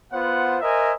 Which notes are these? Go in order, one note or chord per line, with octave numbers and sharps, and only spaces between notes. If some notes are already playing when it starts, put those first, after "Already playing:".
B3 F4 C5 F#5
A#4 C5 D#5 E5 G#5